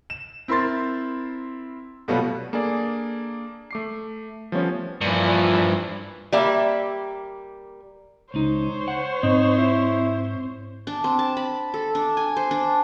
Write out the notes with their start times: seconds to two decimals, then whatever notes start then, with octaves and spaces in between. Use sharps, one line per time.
0.10 E7
0.48 C4 E4 A#4 C6 A6
2.08 B2 F#3 G3 A3 B3 F4
2.53 A#3 D4 G#4 A4 D5
3.71 A3 D6 C7
4.52 F3 G3 A3 B3 C#4 C#5
5.01 G2 A#2 E3 F3
6.33 G3 A#3 E5
8.34 C#2 D#4 C5 C#5
8.88 F#5
9.23 G#2 C4 D#4
9.58 E4
10.87 D4
11.04 C4
11.19 A5
11.37 B5
11.74 A4
11.95 D4
12.17 G#5
12.36 C5
12.51 D4